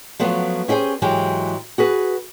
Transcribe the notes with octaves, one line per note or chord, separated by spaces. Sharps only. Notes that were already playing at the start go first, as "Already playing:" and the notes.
F3 F#3 A3 B3
C#4 E4 G4 G#4 C5
G#2 E3 F#3 G#3 G4
F#4 G#4 B4